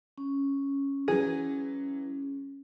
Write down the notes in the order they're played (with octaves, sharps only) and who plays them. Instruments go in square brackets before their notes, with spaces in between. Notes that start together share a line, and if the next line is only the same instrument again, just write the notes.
[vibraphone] C#4
[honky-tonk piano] E3 F#3 [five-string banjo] G#4